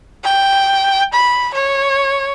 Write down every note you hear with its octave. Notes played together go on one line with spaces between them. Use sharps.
G5
B5
C#5